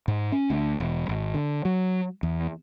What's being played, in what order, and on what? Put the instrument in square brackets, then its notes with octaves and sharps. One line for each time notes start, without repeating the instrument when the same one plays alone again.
[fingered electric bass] G#2
C#4
D2
E1
G#1
D3
F#3
E2